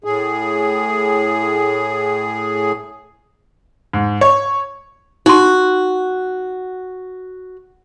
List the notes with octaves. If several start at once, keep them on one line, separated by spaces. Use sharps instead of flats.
A2 G#4
G#2
C#5
D#4 F#4 C6